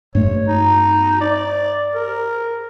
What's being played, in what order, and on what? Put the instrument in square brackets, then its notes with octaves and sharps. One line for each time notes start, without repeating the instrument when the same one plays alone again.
[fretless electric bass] G2 A3 [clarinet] C#5
[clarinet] D#4
D5
A#4